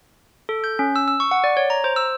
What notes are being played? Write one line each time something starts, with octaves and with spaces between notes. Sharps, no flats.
A4
G6
C#4
E6
E6
C#6
F#5
D5
C#5
A#5
C5
E6